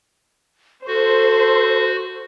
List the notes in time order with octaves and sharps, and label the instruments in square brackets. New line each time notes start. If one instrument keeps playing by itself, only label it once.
[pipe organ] F#4 [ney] A4 [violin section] C5